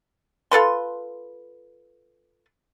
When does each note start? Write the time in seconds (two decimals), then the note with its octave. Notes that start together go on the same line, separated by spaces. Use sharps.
0.51 F4 A4 B4 C6